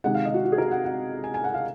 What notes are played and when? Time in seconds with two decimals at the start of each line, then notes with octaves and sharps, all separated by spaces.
0.04 C3 D#3 G#3 F#5
0.15 F5
0.25 D#5
0.34 F#4
0.45 F#4
0.52 G#4
0.58 A#4
0.71 F#5
0.84 F#5
1.24 G#5
1.34 G#5
1.44 F#5
1.54 F5